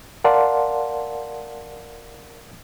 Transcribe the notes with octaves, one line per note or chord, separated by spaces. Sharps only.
A#4 D5 F5 F#5 A5 C6